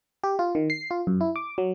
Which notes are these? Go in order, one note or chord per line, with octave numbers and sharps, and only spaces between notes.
G4
F4
D#3
C7
F4
F#2
E4
D6
F#3